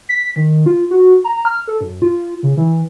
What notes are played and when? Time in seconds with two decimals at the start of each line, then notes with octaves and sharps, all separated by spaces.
0.09 B6
0.36 D#3
0.66 F4
0.91 F#4
1.24 A#5
1.45 F6
1.68 A4
1.81 F#2
2.02 F4
2.43 C#3
2.57 E3